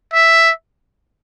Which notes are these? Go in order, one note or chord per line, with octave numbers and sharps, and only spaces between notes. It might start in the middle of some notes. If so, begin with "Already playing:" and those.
E5